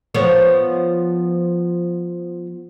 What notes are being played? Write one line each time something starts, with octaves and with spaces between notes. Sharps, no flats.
F3 B3 C#5